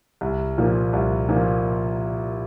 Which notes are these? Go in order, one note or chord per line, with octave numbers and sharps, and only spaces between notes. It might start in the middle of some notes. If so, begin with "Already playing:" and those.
C2
A#2 F3 A#3
C2
A#2 F3 A#3